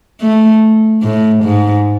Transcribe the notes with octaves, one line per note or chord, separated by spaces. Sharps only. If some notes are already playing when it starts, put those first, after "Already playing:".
A3
A2
G#2